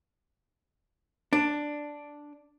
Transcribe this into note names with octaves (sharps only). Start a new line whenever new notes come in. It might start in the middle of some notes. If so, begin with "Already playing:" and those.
D4